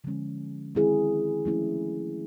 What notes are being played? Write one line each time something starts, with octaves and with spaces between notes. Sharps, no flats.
D3 F3 G#3 C#4
D#3 G#3 C4 E4 G#4
F3 A3 C#4 E4